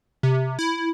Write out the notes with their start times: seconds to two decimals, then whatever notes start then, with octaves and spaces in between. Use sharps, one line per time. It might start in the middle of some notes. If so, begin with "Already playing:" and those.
0.23 C3
0.59 E4